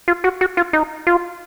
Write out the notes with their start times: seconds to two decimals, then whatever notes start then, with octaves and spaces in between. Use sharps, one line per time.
0.08 F4
0.24 F#4
0.41 F#4
0.57 F4
0.73 D#4
1.07 F4